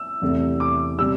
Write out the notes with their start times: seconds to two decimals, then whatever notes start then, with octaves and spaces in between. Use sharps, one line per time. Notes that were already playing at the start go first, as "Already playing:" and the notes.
Already playing: E6
0.22 E2 C3 A3
0.60 D6
0.99 C3 G3 E6